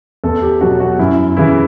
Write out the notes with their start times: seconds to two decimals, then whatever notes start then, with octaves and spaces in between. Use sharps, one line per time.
0.24 E2 A4
0.42 G4
0.61 B2 F#3 F#4
0.80 F#4
0.99 F#2 E4
1.37 C#3 E3 E4